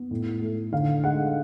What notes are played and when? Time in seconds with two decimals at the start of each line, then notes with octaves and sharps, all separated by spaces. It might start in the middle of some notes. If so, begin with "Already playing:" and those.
Already playing: B3
0.11 A2
0.41 A3
0.72 D3 F5
1.04 G#3 F#5